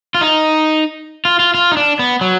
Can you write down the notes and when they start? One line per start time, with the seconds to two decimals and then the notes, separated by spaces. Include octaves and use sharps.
0.15 F4
0.21 D#4
1.25 F4
1.39 F4
1.54 F4
1.72 D#4
1.77 D4
1.99 B3
2.21 F#3